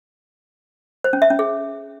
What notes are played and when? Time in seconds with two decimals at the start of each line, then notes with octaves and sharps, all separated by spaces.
1.04 C5
1.13 C#4
1.22 E5
1.30 C#4
1.39 G#4